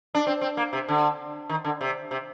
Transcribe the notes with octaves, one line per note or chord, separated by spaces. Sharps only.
D4
C4
C4
A#3
C3
D3
D#3
D3
C3
C3